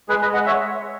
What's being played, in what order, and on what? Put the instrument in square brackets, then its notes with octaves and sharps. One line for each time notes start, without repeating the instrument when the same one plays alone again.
[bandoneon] G#3 G#4 B4
B4 D#5
G#3
D#5 F#5
C#5 E5